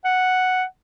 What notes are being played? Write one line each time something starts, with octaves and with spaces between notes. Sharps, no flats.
F#5